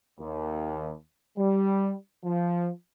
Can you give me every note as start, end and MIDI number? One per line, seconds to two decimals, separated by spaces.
0.19 0.93 39
1.38 1.94 55
2.25 2.69 53